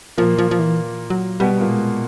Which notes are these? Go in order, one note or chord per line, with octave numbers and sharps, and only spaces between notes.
A#2 F3 A#3
F3
F3
E3
F#3
B2 G3 B3
A#2 A#3
G#3